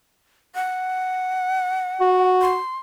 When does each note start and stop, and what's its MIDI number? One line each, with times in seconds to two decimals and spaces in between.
0.55 2.29 78
2.00 2.57 66
2.41 2.78 84